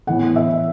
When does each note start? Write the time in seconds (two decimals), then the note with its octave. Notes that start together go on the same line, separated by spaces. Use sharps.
0.07 A2 E3 B3 F#5
0.36 E5